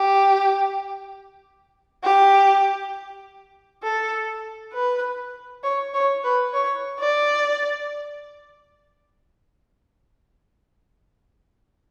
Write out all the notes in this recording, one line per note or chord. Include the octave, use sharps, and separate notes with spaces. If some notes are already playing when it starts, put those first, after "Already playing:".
Already playing: G4
G4
A4
B4
C#5
C#5
B4
C#5
D5